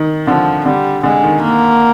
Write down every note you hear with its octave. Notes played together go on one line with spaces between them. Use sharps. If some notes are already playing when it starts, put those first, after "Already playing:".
Already playing: D#3
D3 F3
D3 G3
D3 G#3
D#3
A#3